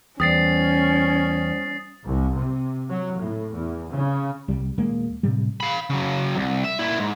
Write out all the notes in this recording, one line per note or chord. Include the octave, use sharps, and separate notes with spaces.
E2 G3 C#4 C5 D5 D#6 A6 C7
C2
C3
F#3
A2
E2
C#3
C2 G3
D#1 G#3 A#3
A2 C3 G3
F5 B5
C#3 F#3
C2
E5
A#2 E4
G#2